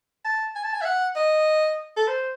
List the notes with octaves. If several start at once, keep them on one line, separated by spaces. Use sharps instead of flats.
A5
G#5
A5
G#5
E5
F#5
D#5
A4
C5